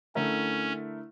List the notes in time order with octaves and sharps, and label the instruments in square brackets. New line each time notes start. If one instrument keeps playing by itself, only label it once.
[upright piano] D3 A3 E4 A#4 E5 [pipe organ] C#4